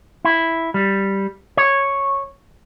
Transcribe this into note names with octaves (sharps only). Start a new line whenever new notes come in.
E4
G3
C#5